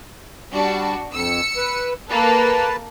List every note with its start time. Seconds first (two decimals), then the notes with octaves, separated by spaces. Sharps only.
0.53 G3 D4 F#4
1.13 F2 E6 C#7
1.57 B4
2.10 A#3 A4 B4 A5